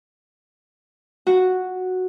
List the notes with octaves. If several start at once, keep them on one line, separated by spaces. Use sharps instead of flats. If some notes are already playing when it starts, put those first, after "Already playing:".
F#4